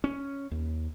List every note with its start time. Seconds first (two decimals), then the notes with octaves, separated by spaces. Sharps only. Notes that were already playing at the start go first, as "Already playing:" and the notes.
0.04 C#4
0.51 D#2